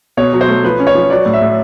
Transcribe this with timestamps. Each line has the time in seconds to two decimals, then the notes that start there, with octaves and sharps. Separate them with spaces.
0.17 B2 C#5
0.33 F#3
0.41 C5
0.48 A3
0.64 F3 B4
0.80 C#4
0.87 C#5
0.95 F3
1.10 F#3 D5
1.26 A2
1.33 E5
1.41 A2